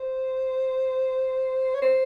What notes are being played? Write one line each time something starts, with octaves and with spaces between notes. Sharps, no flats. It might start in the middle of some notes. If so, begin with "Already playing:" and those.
Already playing: C5
C#5
C5